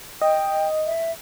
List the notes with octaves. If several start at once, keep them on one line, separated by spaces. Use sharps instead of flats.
D#5 G5
E5